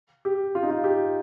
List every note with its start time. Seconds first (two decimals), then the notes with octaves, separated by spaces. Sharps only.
0.25 G4
0.55 F4
0.63 D#4
0.70 F4
0.84 G4